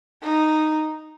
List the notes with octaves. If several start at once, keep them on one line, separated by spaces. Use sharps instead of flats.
D#4